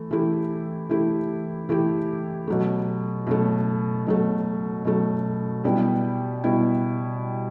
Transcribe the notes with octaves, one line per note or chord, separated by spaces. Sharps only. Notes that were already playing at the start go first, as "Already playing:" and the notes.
Already playing: E3 A3
E3 A3 E4 G4
E3 A3 E4 G4
E3 A3 E4 G4
B2 F#3 A3
B2 F#3 A3
B2 F#3 A3
B2 F#3 A3
B2 G3 B3 E4
B2 G3 B3 E4